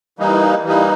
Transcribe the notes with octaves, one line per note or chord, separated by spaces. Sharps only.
E3 G3 A#3 D#4
E3 G3 A#3 D#4